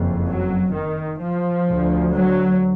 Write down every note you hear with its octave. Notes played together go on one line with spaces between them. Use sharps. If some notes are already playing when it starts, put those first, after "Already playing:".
Already playing: F#1 F2
F#3
D#3
F3
D2
F#3